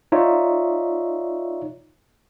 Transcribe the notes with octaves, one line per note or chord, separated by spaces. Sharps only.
D#4 F4 C#5 D5 E5